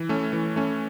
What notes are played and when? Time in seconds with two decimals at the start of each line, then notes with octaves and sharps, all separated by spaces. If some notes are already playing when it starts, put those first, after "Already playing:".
Already playing: E3
0.09 A3 C#4
0.33 E3
0.56 A3 C#4